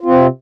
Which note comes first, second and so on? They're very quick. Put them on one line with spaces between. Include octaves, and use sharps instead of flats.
F4 C4 C3